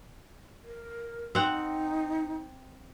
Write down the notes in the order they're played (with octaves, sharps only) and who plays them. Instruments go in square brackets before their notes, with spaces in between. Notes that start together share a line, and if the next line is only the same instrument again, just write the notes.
[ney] A#4
[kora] C4 F#5 [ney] D#4